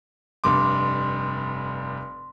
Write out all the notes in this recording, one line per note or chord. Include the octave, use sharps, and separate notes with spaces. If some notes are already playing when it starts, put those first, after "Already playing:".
F1 G2 C6 D6